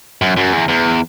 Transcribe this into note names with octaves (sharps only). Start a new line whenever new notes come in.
F#2
F#2
E2
E2